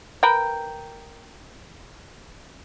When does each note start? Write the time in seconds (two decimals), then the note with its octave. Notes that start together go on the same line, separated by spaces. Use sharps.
0.23 A#4 B4 G5